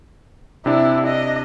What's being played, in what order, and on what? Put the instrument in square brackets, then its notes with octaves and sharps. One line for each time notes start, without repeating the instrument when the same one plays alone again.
[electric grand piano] C3 D4 [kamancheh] E4
[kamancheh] D#5